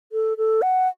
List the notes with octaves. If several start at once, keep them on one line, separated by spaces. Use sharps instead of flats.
A4
A4
F#5